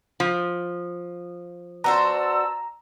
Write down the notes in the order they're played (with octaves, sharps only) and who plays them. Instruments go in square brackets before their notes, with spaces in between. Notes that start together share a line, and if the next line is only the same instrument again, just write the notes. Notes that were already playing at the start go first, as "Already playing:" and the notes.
[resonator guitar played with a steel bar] F3
[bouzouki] B3 F#4 C5 [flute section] D5 A5 E6 [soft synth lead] A#5